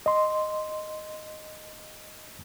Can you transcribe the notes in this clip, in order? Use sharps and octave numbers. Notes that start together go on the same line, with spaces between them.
D#5 C6